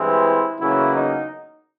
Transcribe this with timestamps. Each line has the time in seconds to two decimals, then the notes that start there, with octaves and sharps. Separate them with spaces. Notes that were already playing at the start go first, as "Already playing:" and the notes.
Already playing: G2 E3 G#3 C4 E4
0.59 E2 C#3 F#3 A#3 E4
0.94 D#4